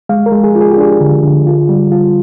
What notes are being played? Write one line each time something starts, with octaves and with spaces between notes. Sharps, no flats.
G#3 F5
A#4
G#3
G#4
F4
G#4
G4
D4 G#4
D3
D3
F4
G3
F4